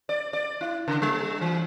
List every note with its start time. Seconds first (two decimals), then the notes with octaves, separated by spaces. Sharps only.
0.09 D5
0.33 D5
0.61 E4
0.88 C#3
1.02 G3
1.41 E3